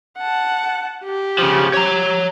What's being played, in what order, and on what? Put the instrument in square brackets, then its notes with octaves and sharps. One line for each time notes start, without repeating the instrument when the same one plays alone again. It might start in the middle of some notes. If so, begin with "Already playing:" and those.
[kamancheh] F#5 A5
G4
[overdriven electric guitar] C#3 F3
C#5 A#5